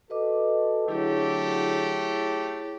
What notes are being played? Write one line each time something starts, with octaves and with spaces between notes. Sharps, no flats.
F#4 A4 B4 D#5 D6
D3 F#3 A3 E4 G4 G#4 C#5